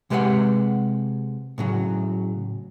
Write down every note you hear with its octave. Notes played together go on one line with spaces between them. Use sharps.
C3 G#3 G4 B4 D5 F#5
A2 C#3 F#3